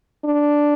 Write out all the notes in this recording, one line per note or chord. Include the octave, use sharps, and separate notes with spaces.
D4